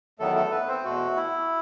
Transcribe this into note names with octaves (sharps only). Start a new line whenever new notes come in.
E2 D#3 F#3 A3 B3 A4
A3 A4
B3 B4
C4 C5
E2 B2 A3 F#4
E4